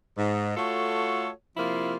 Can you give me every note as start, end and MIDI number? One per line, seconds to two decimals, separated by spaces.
0.18 0.53 44
0.57 1.29 57
0.57 1.29 65
0.57 1.29 66
0.57 1.29 69
0.57 1.29 73
1.57 1.97 48
1.57 1.97 53
1.57 1.97 58
1.57 1.97 64
1.57 1.97 65